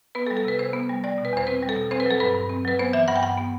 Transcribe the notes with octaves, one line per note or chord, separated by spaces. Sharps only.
B3 B4
A4
G3
A4
C3 B4
C3 C5
B3
G3
G3 D5
B2
B4
E2 C5
C4 B4
G3
A4
B2
C4 C5
B4
F#3 A4
G2 B4
G2
C4
F#3 B4
B3 C5
E3 E5
G2 F#5
G5
G2 F#5
B3